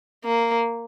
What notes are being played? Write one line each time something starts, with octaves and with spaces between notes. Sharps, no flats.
A#3